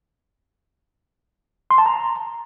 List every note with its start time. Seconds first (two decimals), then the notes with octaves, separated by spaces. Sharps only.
1.71 C6
1.78 A5
1.86 A#5